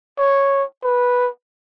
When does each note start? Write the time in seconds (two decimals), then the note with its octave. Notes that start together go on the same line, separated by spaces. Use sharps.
0.18 C#5
0.83 B4